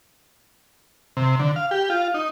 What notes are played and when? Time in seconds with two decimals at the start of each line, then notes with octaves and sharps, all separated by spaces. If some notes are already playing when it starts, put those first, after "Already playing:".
1.17 C3
1.39 D3
1.56 F5
1.71 G4
1.90 F4
2.14 D#4